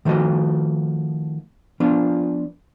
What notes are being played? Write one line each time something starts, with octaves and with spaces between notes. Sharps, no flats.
D#3 F3 A3 F#4 D#5
F3 B3 D4 F4